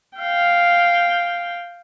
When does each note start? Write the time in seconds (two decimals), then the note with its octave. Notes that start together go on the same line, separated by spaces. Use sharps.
0.18 F5 G5